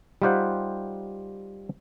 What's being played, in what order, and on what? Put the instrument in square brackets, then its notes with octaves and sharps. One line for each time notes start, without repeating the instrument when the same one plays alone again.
[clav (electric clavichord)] G3 D#4 F4 G4 C5 F#5